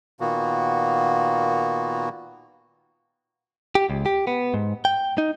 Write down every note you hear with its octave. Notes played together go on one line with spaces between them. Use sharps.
A#2 D#3 A#3 B3 F#4
G4
C#2
G4
B3
G#2
G5
D#4